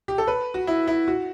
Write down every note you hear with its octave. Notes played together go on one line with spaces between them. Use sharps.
G4
A4
B4
F#4
E4
E4
F#4